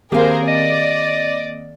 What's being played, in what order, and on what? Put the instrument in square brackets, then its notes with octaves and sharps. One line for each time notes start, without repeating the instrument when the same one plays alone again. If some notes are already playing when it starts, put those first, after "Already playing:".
[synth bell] D#3 A#3 C4 [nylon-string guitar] G4 F5 [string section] G#4 A#4 C5
[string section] D5 [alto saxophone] D#5